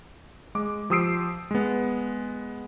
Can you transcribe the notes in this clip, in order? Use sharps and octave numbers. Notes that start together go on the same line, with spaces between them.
G#3 D6
F3 G4 D#6 E6 C7 D7
G#3 B3